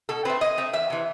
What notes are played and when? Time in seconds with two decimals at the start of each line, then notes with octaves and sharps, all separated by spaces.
0.09 B2 A4
0.25 A3 C4 B4
0.41 B2 D#5
0.57 A3 C4
0.73 E2 E5
0.90 C3 E3